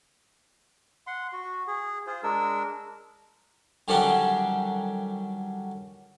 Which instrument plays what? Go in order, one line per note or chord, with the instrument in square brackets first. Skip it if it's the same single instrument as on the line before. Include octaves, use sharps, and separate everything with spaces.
[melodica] F#5 C6
F#4
G#4
F4 G#4 C5
G#3 D4 A#4 E6
[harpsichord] D3 D#3 F#3 G3 C#4 D4